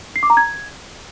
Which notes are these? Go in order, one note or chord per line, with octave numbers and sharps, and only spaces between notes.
C7
D6
A#5
G#6